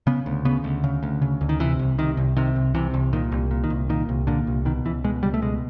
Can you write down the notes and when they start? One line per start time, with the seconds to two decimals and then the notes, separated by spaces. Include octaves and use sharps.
0.07 C#3 B3
0.26 D2
0.45 C#3 B3
0.64 D2
0.84 C#3
1.03 D2
1.22 C#3
1.41 D2
1.49 D#3
1.60 C3 E3
1.79 C2
1.98 C3 D#3
2.17 C2
2.37 C3 D#3
2.56 C2
2.75 C3 E3
2.94 C2
3.13 A#2 D#3
3.32 C2
3.51 A#2
3.64 D#3
3.70 C2
3.89 A#2 D#3
4.09 C2
4.27 A#2 D3
4.47 C2
4.65 B2 D#3
4.85 C#2 E3
5.04 B2 G#3
5.23 C#2 G3
5.34 A3
5.42 B2 G#3